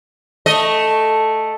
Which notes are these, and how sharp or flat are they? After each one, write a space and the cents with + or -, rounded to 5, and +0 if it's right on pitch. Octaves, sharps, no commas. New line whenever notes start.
A3 +0 D#5 +0